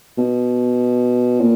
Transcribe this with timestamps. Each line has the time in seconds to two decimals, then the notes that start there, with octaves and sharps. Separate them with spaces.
0.18 B2
1.41 A#2